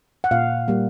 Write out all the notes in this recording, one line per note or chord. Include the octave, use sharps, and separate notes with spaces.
F#5
A#2 F5
G3 A#3